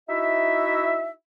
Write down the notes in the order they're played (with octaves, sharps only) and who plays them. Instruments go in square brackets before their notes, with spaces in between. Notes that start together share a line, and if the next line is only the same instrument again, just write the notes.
[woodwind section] D#4 E4 F#4 E5